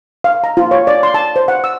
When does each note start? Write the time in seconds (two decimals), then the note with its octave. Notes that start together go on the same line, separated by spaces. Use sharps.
0.24 F5
0.44 A#5
0.57 F4
0.71 C#5
0.87 D5
1.03 C6
1.14 A5
1.36 C5
1.48 F#5
1.64 E6